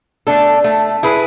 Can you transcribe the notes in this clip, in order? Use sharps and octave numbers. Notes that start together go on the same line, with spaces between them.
A3 D4 A4
A3
E4 G#4 B4